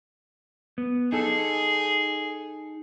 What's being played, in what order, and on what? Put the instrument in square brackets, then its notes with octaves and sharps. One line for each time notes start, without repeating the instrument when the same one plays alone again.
[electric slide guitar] B3
[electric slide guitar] D#4 A4 [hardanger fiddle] G#4